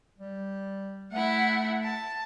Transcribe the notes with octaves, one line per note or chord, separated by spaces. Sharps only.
G3
A3 E4 F#5
A5